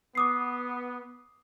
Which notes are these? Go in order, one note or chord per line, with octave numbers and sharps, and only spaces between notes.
B3 D6 D#6 C7